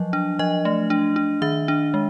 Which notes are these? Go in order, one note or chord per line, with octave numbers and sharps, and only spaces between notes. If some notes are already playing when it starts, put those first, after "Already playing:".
Already playing: F3 F#3 D#5
D4
F3 D#5
A3
D4
D4
D#3 E5
D4
G#3